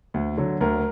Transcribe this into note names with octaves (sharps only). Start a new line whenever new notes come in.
D2
D3 F#3
D2 A#4